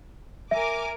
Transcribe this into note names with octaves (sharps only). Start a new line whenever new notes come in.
A#4 E5 G#5 D6